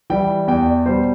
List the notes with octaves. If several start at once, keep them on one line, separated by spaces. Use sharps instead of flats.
E3 G3 G5
E2 G5
D5
B2 G3 B3 C5